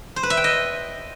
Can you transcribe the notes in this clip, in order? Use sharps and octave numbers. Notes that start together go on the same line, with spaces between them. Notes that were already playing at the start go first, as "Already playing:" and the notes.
C5
B4
E5
G5
D#5